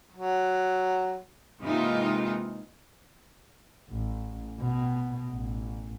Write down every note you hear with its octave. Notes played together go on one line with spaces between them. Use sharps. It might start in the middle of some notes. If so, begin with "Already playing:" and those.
F#3
C3 E3 G#3 A#3 D#4 F4
A1
B2
A1